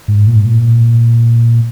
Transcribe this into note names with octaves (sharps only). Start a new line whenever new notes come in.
G#2
A#2
G#2
A#2